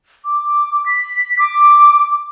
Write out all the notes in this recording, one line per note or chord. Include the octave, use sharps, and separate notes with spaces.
D6
B6
D6